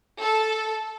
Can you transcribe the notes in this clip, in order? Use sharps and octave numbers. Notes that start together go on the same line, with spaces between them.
A4